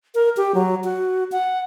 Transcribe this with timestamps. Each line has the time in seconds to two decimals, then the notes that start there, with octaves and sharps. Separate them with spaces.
0.15 A#4
0.37 G4
0.55 F#3
0.84 F#4
1.32 F#5